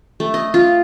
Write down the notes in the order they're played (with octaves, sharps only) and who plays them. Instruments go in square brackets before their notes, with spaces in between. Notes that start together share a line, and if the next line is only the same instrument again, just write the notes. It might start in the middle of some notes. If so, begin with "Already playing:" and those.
[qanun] A3
D#5
F4